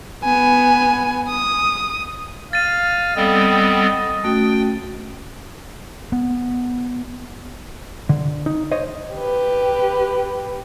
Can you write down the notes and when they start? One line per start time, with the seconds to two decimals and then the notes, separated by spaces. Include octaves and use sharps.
0.24 B3 G#5
1.29 D#6
2.53 F5 A6 D#7
3.16 G3 B3 C4 A4 D#5
4.24 A3 C#4 F#4 G5
6.12 B3
8.09 D3
8.46 D#4
8.71 C5 C#5 D#5
9.14 G4 B4